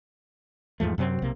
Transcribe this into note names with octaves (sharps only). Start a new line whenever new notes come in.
E2 G#2 F3 A3
F#2 C3 F#3 C4
B1 C3 A#3